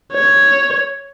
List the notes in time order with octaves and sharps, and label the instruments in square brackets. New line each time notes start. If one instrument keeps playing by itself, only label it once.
[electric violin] C#5